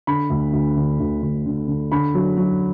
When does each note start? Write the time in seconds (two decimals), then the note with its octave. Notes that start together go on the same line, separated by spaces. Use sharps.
0.07 D3 B5
0.30 D2
0.53 D2
0.77 D3
1.00 D2
1.23 D2
1.46 D3
1.68 D3
1.92 D3 B5
2.15 F#3
2.37 F#3